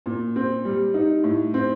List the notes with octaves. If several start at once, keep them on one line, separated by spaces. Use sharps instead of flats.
A#2
C4
G3
D#4
A2
C4